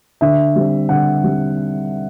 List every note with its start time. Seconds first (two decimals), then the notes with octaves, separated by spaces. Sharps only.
0.21 D3 E5
0.56 G3 C4
0.89 D3 F#5
1.24 G3 C4